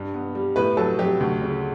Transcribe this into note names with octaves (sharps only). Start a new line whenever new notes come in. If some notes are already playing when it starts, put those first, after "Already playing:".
Already playing: G2
B3
G3
A2 B4
F#3 A4
F#3 G4
D2
C#3